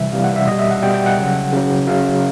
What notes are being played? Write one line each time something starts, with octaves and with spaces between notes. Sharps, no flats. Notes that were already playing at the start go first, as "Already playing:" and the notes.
Already playing: C3 E3 G3 E5
C3 E3 G3 F5
F#5
E5
B2 G3 D#5
E5
F#5
B2 G3 G5
G5
F#5
C#3 F#3
C#3 F#3
C#3 F#3 F5